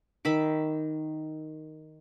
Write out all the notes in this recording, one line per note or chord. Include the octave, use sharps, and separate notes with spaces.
D#3 E5 B5 D6